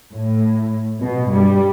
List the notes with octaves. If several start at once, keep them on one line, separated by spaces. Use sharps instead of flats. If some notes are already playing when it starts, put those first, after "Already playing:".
A2
B2
G2 G3